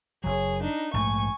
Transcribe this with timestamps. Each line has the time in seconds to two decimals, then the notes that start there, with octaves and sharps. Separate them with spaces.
0.24 F#1 F#3 G#4 C#5
0.62 D4 D#4
0.94 A#1 G#2 A3 G#5 C#6